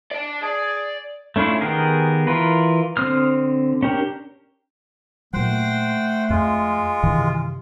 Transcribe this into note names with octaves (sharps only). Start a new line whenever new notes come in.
D5 A5
G#4 D5
A3 C#4 D4 E4 F4
D#3 B3 G4 G#4 A#4
E3 F4 A#4 B4
D3 C4 D#6 F6
C#4 D4 G4 A#4
A#2 F#3 A3 C5 F#5 G5
F2 G#3 F4
G2 C3 D#3 E3